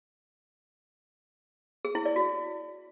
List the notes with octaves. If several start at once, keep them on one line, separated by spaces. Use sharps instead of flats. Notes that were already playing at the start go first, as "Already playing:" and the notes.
G#4
E4
D5
F#4